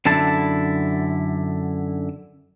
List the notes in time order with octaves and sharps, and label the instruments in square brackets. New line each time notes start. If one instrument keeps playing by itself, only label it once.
[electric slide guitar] F#2 D3 E4 A5